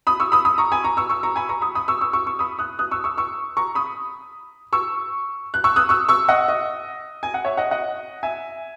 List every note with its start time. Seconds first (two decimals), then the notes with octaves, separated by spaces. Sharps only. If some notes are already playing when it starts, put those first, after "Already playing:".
0.07 B5 D#6
0.20 C#6 E6
0.32 B5 D#6
0.45 B5 D#6
0.58 A#5 C#6
0.72 G#5 B5
0.84 A#5 C#6
0.97 C#6 E6
1.10 C#6 E6
1.23 A#5 C#6
1.36 G#5 B5
1.49 A#5 C#6
1.61 B5 D#6
1.75 B5 D#6
1.88 C#6 E6
2.01 C#6 E6
2.13 C#6 E6
2.27 C#6 E6
2.39 B5 D#6
2.59 D#6 F#6
2.79 D#6 F#6
2.91 C#6 E6
3.04 C#6 E6
3.17 C#6 E6
3.57 A#5 C#6
3.75 B5 D#6
4.73 C#6 E6
5.54 F#6
5.64 C#6 E6
5.76 D#6 F#6
5.89 C#6 E6
6.09 C#6 E6
6.28 D#5 F#5
6.48 D#5
7.23 G#5
7.34 F#5
7.45 C#5 E5
7.57 D#5 F#5
7.71 D#5 F#5
8.23 E5 G#5